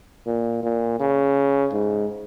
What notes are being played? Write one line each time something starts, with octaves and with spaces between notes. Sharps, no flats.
A#2
A#2
C#3
G#2